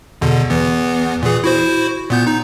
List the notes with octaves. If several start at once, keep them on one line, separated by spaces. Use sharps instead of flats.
E2 B2 D3
E2 E3 B3
A#2 E3 G#4
E4 F#4 C5
A#2 B3 G6
D#4